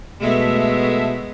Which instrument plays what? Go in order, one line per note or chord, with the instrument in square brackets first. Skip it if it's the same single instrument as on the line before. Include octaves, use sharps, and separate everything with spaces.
[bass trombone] B2 [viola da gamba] G#3 B3 [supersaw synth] A3 E5